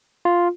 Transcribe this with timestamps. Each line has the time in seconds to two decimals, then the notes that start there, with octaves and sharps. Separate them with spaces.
0.25 F4